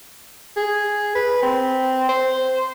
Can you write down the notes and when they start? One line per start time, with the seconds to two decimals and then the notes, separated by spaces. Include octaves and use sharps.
0.57 G#4
1.15 B4
1.42 C4
2.09 C5